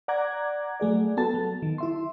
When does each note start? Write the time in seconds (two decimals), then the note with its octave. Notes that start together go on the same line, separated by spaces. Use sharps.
0.08 D5 F#5 A#5 D6 F#6 G#6
0.80 F#3 A3 G#4 D5
1.17 B3 F#4 A4 A5
1.34 F#3
1.62 D#3
1.78 E4 E5 C6